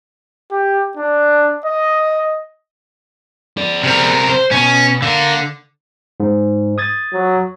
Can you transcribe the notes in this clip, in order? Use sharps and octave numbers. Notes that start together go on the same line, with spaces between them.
G4
D4
D#5
G#4 D5
C3 A#4
C5
B2 C#4
D3 A#4 F5
G#2
D#6 G#6 A6
F#3